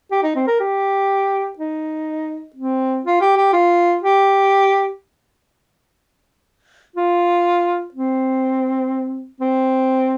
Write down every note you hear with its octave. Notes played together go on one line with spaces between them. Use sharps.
G4
D#4
C4
A#4
G4
D#4
C4
F4
G4
G4
F4
G4
F4
C4
C4